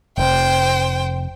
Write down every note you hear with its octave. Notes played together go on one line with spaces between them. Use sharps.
F1 C5 G5